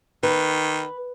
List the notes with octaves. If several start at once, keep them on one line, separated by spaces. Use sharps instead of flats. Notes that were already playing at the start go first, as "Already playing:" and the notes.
D#3 B4